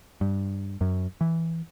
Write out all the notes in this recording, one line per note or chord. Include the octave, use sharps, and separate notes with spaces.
G2
F#2
E3